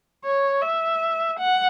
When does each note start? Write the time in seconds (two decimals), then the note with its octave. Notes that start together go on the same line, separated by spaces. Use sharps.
0.24 C#5
0.62 E5
1.39 F#5